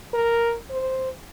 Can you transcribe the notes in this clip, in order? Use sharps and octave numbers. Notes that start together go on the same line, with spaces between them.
A#4
C5